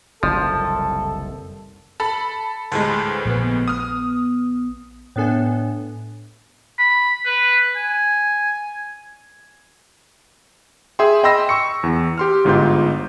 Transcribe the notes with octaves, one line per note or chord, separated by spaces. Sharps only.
F#1 C2 D#3 F3 A4
A4 B5
D2 A2 G#3 A4 B4 C5
A#1 B3
D#6 F6
A2 B3 D4 A4 G#5
B5
B4
G#5
G#4 E5 G5 C6
D#5 G5 B5 C6 E6 A#6
C#6 E6 C#7
E2
G4 C6 F6
G1 G#2 D#4 F4 G6